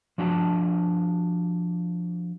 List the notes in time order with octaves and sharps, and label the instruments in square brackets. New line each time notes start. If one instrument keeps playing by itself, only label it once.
[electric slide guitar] F3 D4 F#4 F5 A5